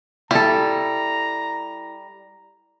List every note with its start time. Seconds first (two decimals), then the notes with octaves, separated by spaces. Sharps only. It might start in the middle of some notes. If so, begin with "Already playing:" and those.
0.31 G3 E4 A4 A#5